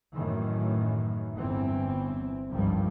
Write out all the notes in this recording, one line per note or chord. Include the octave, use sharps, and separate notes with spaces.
F#2 A2 D#3 E3
G1 E2 E3 C4
G#1 C#2 G2 D#3 F3 G3